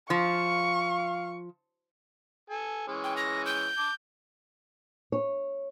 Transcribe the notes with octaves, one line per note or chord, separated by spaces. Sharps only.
F3 F5 C#6
A4 G#5
E3 G#3 C#4
G5
A#6
G6
A5 D6
C#5